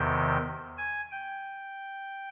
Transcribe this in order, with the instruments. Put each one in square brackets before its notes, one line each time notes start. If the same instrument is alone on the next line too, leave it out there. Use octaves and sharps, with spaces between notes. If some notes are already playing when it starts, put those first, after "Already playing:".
Already playing: [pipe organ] E2 C3 D#3 G5
G#5
G5